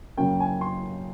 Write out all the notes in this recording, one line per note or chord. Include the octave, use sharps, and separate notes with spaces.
F#2 C#3 F#3 A#3 G5
G#5
C6